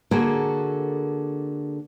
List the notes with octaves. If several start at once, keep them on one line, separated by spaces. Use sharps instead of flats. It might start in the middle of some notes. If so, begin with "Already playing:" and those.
D3 A#3 F#4 G#4 A4